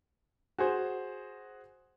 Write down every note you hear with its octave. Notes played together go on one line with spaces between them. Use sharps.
F#4 G#4 C5